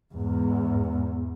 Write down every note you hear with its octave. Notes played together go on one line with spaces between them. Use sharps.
E2 G#2